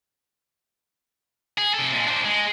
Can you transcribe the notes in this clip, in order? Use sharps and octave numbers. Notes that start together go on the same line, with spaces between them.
G#4
C3 A4
A#2 G#3
D4 C5
G#3